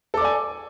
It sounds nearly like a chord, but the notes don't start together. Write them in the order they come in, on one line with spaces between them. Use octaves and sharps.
A4 D6 D5 G#5